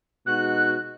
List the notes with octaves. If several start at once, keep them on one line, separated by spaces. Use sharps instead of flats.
B2 G#3 D#4 F#4 F#6